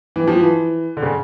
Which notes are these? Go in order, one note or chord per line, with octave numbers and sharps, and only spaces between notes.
E3
F3
E3
D3
C#3